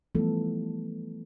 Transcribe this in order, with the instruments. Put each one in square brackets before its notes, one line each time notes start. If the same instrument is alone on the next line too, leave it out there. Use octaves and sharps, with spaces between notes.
[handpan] E3 F3 G3 A3 B3 A4